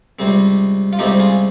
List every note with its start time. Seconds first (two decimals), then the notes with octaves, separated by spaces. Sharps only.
0.19 C#2 C3 G3 C4
0.93 F4
0.99 C#2 C3 G3 C4 D#4 G4
1.19 F4 G#4